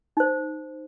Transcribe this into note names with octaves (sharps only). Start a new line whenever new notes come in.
D#4 C5